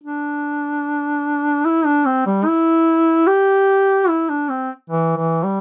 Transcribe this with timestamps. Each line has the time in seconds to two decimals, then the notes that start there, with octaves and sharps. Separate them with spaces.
0.04 D4
1.65 E4
1.86 D4
2.06 C4
2.26 G3
2.46 E4
3.27 G4
4.08 E4
4.29 D4
4.50 C4
4.90 E3
5.17 E3
5.43 G3